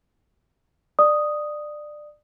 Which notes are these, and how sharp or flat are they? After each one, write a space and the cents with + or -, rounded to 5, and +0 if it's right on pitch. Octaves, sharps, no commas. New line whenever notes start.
D5 +20 D#6 +0